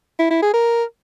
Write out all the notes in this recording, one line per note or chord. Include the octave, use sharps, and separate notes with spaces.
E4
E4
G#4
A#4